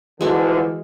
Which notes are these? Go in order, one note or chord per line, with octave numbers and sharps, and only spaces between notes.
D2 D3 E3 F3 G#3 F#4